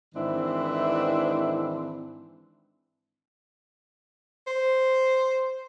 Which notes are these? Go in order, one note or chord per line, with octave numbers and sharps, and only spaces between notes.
G#2 D#3 E3 C4 D4 E4
C5